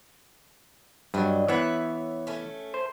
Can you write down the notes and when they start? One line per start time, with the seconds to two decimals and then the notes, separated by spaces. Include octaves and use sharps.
1.14 G2 F#3 D4 D5 D#5
1.48 E3 B3 C#5 E5 F#5
2.27 A3 C#4
2.74 C5